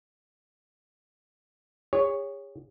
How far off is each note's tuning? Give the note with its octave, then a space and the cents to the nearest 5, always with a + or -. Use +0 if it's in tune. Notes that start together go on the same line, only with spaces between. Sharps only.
G#4 -40 C#5 +0